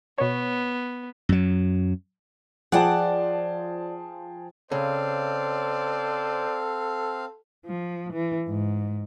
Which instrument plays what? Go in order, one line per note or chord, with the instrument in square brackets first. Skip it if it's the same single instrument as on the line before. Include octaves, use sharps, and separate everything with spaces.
[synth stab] B2 C#5 [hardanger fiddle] B3
[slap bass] F#2 F#3
[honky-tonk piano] F3 [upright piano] G#4 G5 A5 [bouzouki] D5 F#5
[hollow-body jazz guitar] C#3 [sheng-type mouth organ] C4 F5 [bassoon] A4 [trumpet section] C5 D5
[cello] F3
E3
G#2